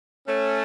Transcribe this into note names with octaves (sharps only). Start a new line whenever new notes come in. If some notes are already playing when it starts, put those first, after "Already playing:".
A3 C#4